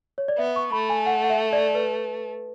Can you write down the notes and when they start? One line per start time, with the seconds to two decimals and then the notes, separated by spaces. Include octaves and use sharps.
0.18 C#5
0.28 D5
0.38 B3 E5
0.56 C#6
0.72 A3 B5
0.89 G#5
1.06 F#5
1.24 F#5
1.30 E5
1.53 D5
1.75 B4